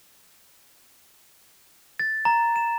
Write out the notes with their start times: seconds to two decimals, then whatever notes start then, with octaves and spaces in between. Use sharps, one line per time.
1.99 A6
2.25 A#5
2.56 E7